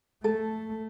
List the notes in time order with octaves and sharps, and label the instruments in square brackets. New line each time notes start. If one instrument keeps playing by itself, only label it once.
[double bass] A3 [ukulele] A4